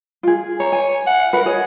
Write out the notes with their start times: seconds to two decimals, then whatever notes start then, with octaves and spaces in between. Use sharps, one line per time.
0.23 F4 G#4
0.60 C#5 A#5
0.72 G#5
1.06 F#5
1.33 A#4 B4 F#5
1.46 G#4 C#5 D#5